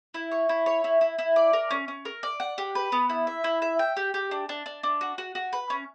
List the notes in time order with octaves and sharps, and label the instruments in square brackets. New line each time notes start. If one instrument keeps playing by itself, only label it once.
[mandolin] E4
C#5
E4
C#5
E4
E4
E4
D5
A#4
C#4
C#4
A#4
D5
F#5
G4
B4
B3
E4
E5
E4
E5
G5
G4
G4
D4
D4
D4
D4
F#4
F#4
F#4
B4
C#4